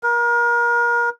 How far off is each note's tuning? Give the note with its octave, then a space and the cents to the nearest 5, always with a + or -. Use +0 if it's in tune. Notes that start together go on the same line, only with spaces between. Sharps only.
A#4 +30